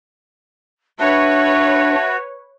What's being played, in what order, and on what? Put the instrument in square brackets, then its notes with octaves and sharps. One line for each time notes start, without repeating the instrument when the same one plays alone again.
[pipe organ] D4 [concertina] F#4 [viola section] B4 C#5 [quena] E5